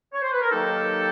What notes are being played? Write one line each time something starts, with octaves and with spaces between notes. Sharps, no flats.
C#5
C5
B4
A#4
D#3 F#3 A#3 D#4 G4 A4